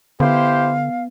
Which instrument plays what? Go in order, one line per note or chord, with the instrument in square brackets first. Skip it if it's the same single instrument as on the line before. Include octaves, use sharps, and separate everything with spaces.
[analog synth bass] D3 [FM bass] B3 [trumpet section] E4 G4 C5 [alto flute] F5